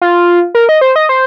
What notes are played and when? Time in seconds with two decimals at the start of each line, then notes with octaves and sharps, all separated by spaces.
0.02 F4
0.55 A#4
0.69 D#5
0.81 C5
0.96 D#5
1.09 C5